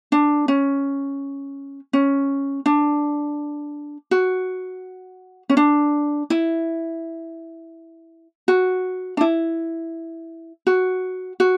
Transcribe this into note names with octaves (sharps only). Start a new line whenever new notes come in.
D4
C#4
C#4
D4
F#4
C#4
D4
E4
F#4
D4
E4
F#4
F#4